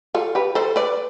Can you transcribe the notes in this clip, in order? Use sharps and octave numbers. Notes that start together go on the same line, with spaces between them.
F4 A4
G4 B4
A4 C5
B4 D5